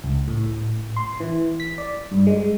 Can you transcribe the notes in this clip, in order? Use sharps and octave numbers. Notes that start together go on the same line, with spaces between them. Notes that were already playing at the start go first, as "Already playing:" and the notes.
C#2
A2
C6
E3
B6
D5
G2
G#3